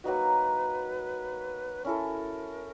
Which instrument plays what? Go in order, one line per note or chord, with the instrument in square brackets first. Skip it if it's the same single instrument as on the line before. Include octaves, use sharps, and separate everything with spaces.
[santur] F#3 A#3 D#4 F#4 [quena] B4
[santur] C#4 E4 A4 [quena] A#4